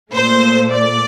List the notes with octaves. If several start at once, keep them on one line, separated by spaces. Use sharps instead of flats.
A#2 A3 C5
D5